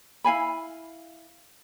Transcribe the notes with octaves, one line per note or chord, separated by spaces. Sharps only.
E4 F5 G#5 B5